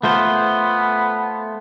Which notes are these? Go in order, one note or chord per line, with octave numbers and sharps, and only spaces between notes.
A3 B3 F4 C5